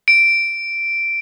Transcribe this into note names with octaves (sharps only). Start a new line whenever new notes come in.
D7